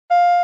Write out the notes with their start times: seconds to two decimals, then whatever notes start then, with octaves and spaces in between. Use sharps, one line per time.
0.11 F5